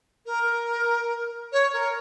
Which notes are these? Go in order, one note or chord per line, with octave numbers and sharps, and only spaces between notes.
A#4
C#5
A#4